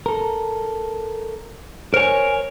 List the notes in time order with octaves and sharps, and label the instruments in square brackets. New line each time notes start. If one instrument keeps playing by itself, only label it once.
[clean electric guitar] A4 A#4
[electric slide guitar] A#4 C#5 [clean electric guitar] C5 G#5